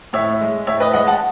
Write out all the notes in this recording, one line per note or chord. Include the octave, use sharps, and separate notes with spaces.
A2 C#5 E5
G#3
A2 C#5 E5
B4 D#5
G#3 D#5 F#5
F#5 A5